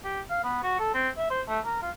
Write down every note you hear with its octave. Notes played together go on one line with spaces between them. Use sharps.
G4
F5
B3
F#4
A4
C4
E5
C5
A3
A#4
F4